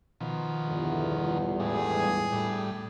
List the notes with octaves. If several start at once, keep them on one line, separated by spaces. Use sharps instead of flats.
B2 D#3 F3
G1 E2
A2 G3 G#3 G#4
A2 G3